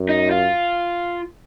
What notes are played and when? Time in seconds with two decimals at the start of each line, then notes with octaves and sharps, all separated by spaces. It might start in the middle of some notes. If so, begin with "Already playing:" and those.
Already playing: F#2
0.09 D#4
0.31 F4